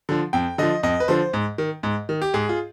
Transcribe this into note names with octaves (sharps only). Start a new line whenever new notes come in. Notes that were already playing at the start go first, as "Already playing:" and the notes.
D3 F3
F2 G5
D3 F3 D#5
F2 D#5
B4
D3 F3 C5
G#2
D#3
G#2
D#3
G4
G#2 G#4
F4